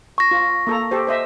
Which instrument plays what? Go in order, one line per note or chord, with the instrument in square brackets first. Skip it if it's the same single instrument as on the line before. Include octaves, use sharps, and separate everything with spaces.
[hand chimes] C#6 A#6
[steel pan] F4
A#3 A4 A#5
G4 A4 C5
C5 D#5 E5